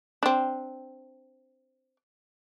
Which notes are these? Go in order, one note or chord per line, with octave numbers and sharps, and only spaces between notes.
C4 D4